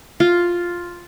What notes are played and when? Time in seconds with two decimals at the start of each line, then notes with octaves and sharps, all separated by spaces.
0.20 F4